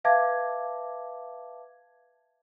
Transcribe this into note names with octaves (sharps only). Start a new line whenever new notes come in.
B4 E5 F5 A5 D6 G#6